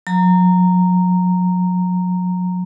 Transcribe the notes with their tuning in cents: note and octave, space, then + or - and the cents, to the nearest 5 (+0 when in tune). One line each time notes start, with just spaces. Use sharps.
F#3 -35 A#5 -10